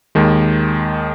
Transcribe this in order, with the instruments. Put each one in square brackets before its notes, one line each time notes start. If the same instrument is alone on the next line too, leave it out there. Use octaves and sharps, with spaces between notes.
[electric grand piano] D#2 D#3 G#3